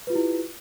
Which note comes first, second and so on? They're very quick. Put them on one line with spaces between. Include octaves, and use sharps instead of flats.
B4 F4 G4 E4